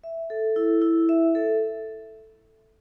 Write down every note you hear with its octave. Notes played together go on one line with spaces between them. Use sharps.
E5
A4
E4
E4
E5
A4